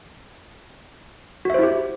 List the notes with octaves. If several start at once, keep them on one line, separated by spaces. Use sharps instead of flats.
E4 F#4 G4 C5 E5